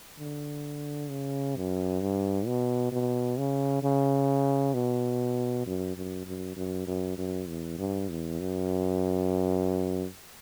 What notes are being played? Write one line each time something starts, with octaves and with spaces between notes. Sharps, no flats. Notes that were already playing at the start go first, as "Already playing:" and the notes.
D3
C#3
F#2
G2
B2
B2
C#3
C#3
B2
F#2
F#2
F#2
F#2
F#2
F#2
E2
G2
E2
F#2